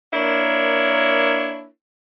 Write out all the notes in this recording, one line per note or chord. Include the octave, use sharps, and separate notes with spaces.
A#3 D4 E4 A#4 C#5